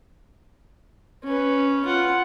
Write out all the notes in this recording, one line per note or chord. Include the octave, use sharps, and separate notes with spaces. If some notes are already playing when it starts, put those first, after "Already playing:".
C#4 B4
F4 F#5